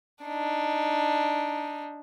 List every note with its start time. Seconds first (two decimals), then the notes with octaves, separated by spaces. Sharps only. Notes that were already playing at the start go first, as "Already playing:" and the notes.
0.24 D4 D#4